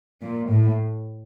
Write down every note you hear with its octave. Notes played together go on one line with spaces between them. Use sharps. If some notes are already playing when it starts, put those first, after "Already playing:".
A#2
A2